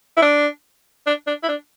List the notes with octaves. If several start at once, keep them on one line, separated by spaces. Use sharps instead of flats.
E4
D4
D4
D4
E4
D4